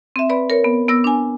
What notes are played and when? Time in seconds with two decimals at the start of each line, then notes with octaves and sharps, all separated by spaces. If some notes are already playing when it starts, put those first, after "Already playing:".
0.16 C4 E5
0.29 B4 D5 B5
0.50 A#4 C#5
0.64 B3
0.88 B3 E6 A#6
1.04 D4 G#5